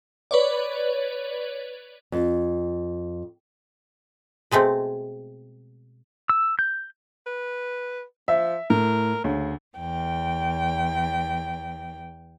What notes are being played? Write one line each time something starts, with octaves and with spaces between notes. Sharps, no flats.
B4 C#5 D5
F2
B2 G#3 A3 C4
E6
G6
B4
F3 E5
A2 A#4
D2 C#3
E2 G5